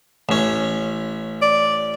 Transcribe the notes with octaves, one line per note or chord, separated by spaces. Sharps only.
A1 C#4
D5